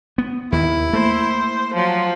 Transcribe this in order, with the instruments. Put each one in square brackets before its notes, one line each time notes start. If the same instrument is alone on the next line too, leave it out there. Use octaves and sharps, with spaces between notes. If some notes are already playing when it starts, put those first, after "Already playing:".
[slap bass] B3
[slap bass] D#2 D#3 [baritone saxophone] E4
[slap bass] A3 A#3 [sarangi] C5
[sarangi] F3 [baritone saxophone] F#3